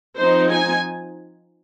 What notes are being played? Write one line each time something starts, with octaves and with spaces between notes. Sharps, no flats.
F3 C4 D#4 C5
G#5